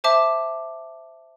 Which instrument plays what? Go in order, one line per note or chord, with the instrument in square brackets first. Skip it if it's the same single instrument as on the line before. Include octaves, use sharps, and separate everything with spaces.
[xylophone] C5 E5 A5 D6